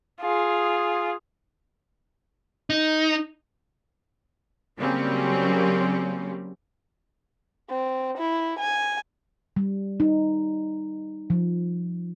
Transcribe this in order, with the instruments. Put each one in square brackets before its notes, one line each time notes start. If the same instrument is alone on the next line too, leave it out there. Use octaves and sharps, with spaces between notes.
[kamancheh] F4 G#4
[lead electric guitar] D#4
[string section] C#3 F#3 G3 A#3 C4 C#4
[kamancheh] C4
E4
G#5
[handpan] G3
D#4
F3